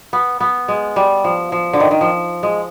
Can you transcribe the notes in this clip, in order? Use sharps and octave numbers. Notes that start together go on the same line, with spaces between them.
B3
B3
G#3
G3
F3
F3
D3
D#3
D#3
F3
G#3